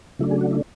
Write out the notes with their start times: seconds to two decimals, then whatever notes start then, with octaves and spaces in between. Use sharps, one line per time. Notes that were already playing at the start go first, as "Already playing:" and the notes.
0.19 C#3 F#3 A3 D4 E4
0.31 G#4
0.41 F#4
0.51 E4